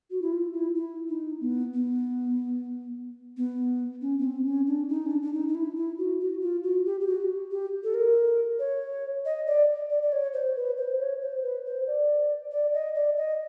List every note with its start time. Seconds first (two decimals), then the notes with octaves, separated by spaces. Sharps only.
0.11 F#4
0.22 E4
0.32 F4
0.53 E4
0.75 E4
1.09 D#4
1.41 B3
1.74 B3
3.37 B3
4.02 C#4
4.19 B3
4.24 C4
4.46 C#4
4.67 D4
4.89 D#4
5.06 C#4
5.11 D4
5.22 D4
5.33 D#4
5.48 D#4
5.55 E4
5.76 E4
5.98 F#4
6.20 F#4
6.41 F4
6.64 F#4
6.85 G4
7.00 G4
7.07 F#4
7.51 G4
7.84 A4
7.94 A#4
8.59 C#5
9.25 D#5
9.47 D5
9.90 D5
10.03 D5
10.12 C#5
10.33 C5
10.56 B4
10.77 C5
10.99 C#5
11.21 C5
11.43 B4
11.65 C5
11.87 D5
12.51 D5
12.74 D#5
12.95 D5
13.17 D#5